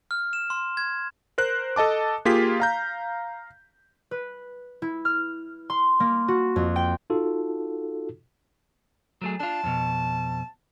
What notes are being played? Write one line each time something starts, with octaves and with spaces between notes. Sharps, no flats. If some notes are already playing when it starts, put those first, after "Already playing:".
F6
E7
C6
G#6
A#4 C5 F#6
A4 D#5 A5 D6
A#3 F4 G4 G#4 B6
F5 A#5 G6
B4
E4
F6
C6
A#3
F#4
F2
G5
D#4 F4 F#4 A4
F#3 A3 G#4
D4 F4 A5
F2 B2